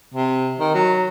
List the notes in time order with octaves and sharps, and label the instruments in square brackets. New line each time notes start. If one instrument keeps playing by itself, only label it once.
[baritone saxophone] C3
D#3
F#3